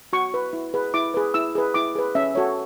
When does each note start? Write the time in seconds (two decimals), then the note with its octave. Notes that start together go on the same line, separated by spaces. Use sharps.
0.13 F#4 C#6
0.34 B4
0.53 E4
0.74 G#4 B4
0.94 E4 D6
1.14 G#4 B4
1.34 E4 E6
1.55 G#4 B4
1.74 E4 D6
1.95 G#4 B4
2.15 C#4 E5
2.35 F#4 A4 C#5